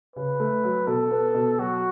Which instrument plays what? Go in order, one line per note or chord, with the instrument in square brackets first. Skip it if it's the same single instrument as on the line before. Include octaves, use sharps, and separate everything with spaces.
[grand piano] C#3 [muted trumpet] B4
[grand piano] A3
F#3
[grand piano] B2 [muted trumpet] A4
[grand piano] B3
B2
[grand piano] F#3 [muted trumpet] F#4